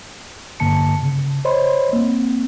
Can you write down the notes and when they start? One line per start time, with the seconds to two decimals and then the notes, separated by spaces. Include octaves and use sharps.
0.60 G2 D3 A#3 A5 C#7
1.02 C#3
1.45 C5 C#5 D#5 B5 C6
1.93 A#3 C4